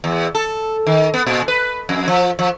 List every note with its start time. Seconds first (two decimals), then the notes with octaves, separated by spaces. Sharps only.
0.04 E2
0.35 A4
0.87 D#3
1.14 B3
1.27 A#2
1.48 B4
1.89 F2
2.08 F3
2.39 F3